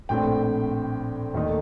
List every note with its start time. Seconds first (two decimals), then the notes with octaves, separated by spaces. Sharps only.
0.09 A#1 A2 A3 C4 G5
1.34 D#2 D#3 A3 D#4